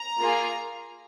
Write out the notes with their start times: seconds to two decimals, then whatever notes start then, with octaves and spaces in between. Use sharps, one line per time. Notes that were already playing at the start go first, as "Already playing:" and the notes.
Already playing: A#5
0.20 A#3 F4 G#4